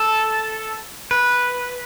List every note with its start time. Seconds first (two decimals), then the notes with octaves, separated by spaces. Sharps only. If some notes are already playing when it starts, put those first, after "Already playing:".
Already playing: A4
1.11 B4